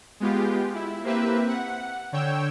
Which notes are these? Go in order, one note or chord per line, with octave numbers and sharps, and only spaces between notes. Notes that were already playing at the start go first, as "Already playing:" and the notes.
G#3 B3 F4 G4
E4
A#3 C4 G4 B4 E5
F#5
D3 C#5 G5 E6